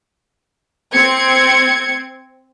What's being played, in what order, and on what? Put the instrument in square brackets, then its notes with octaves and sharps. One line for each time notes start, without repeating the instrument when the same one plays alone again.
[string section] C4 G#6 C#7